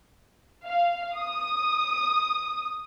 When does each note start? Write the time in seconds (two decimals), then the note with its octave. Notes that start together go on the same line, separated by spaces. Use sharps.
0.65 F5
1.17 D#6